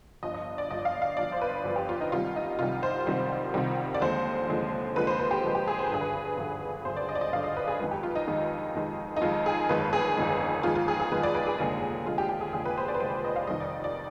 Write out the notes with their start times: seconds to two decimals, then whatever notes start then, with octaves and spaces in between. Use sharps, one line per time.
0.23 G1 G2 F3 D#5
0.34 D#5
0.58 D5
0.71 G1 G2 F3 D#5
0.85 F5
1.02 F5
1.17 G1 G2 F3 D5
1.32 C5
1.41 B4
1.64 G1 G2 F3
1.76 G4
1.89 F4
2.01 D#4
2.12 C2 C3 D#3 G3 F4
2.36 D#4
2.59 C2 C3 D#3 G3 F4
2.83 C5
3.07 C2 C3 D#3 G3
3.54 C2 C3 D#3 G3
3.94 D5
4.01 D#2 D3 F3 G#3 C5
4.48 D#2 D3 F3 G#3
4.96 D#2 D3 F3 G#3 B4
5.07 C5
5.19 B4
5.31 G4
5.44 D#2 D3 F3 G#3
5.55 G4
5.67 G#4
5.79 C5
5.87 B4
5.90 G#1 G2 D3 G#4
6.01 B4
6.37 G#1 G2 D3
6.85 G#1 G2 D3 C5
6.97 D5
7.09 D#5
7.15 D5
7.21 D#5
7.32 G#1 G2 D3 F5
7.44 D#5
7.57 B4
7.68 G#4
7.80 F2 D#3 G#3 B4
7.91 G4
8.03 F4
8.15 D#4
8.28 F2 D#3 G#3
8.75 F2 D#3 G#3
9.16 D#4
9.21 F2 D#3 G#3 F4
9.46 G#4
9.69 G1 F2 D#3 G#3 B4
9.93 G#4
10.17 G1 F2 D#3 G#3
10.63 G1 F2 D#3 G#3 F4
10.75 F4
10.88 G#4
11.00 G#4
11.12 G1 F2 D#3 G#3 B4
11.23 D5
11.34 B4
11.47 G#4
11.59 F1 D#2 D3 G#3
12.06 F1 D#2 D3 G#3 F4
12.18 G4
12.29 G4
12.41 G#4
12.53 F1 D#2 D3 G#3 G#4
12.65 B4
12.77 C5
12.88 D5
12.95 B4
13.00 F1 D#2 D3 G#3 C5
13.24 D#5
13.36 F5
13.47 F1 F2 D#3 G3 D#5
13.60 D5
13.84 D5